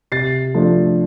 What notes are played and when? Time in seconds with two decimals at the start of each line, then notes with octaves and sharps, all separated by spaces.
0.12 C3 A6 C7
0.55 F3 A3 D4